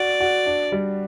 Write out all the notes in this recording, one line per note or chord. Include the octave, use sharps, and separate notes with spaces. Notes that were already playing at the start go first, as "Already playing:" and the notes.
Already playing: F#4 D5
F#4
D4
G3